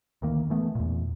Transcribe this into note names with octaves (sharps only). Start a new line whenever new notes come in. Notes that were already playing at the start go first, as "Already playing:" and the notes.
D2 D#3 A#3
E3 A3 B3
E2 A#2